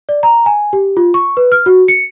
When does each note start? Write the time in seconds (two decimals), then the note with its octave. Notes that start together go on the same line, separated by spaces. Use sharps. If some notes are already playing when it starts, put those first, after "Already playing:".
0.09 D5
0.23 A#5
0.46 G#5
0.73 G4
0.97 F4
1.14 C#6
1.37 B4
1.52 F6
1.66 F#4
1.88 C#7